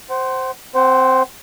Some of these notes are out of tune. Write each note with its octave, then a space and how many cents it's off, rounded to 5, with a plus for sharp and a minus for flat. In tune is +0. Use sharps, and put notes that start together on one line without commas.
C5 +0 F#5 +40
C4 +0 C5 +0 F#5 +35